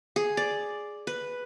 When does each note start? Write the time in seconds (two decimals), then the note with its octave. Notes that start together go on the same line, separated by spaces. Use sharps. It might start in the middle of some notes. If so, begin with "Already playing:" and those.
0.16 G#4
0.37 D5
1.07 B4